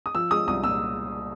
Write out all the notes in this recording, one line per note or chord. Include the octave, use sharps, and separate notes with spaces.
D#6
F3 E6
G#3 D#6
C2 D#6
A#2 E6